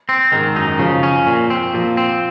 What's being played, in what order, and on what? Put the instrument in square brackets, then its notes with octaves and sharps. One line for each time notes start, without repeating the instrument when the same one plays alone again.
[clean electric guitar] C4
[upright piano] G#2 [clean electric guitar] D#3
[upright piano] F#2 [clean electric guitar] D#4
[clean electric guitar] C#3 [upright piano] F3
[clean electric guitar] C#4
A#2
C4
[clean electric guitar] A#2 [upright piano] F3
[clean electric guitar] C4